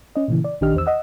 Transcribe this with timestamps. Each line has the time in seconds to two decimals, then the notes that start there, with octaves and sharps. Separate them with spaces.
0.16 C#4 D#5
0.28 A#2 C#3 E3
0.44 D5
0.61 A#1 D#3 D4 G4 D#5 F6
0.74 E2 C5 E6
0.86 D#5 F#5 E6